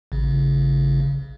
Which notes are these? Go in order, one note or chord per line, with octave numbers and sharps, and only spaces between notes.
A1 C#3